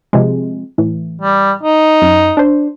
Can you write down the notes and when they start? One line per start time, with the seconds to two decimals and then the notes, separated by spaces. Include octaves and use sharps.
0.13 C3 F3 G#3
0.78 A2 E3
1.21 G3
1.63 D#4
2.02 F#2
2.37 D4 C5